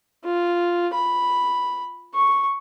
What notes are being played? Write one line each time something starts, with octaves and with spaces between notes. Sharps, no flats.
F4
B5
C#6